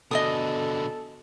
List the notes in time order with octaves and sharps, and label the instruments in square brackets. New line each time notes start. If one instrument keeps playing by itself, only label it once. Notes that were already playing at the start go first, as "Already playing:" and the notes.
[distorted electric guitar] B2 D3 [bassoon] A4 [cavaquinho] D#5 G#5 D#6